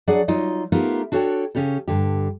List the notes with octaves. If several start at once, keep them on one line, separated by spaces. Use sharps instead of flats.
F#3 D4 G#4 D5 F#5
F#3 D#4 F4 D#5
A3 B3 D#4 F4 G4 A#4
D4 F#4 A4 C#5 G5
C#3 C#4 G4 A4
G2 D3 G4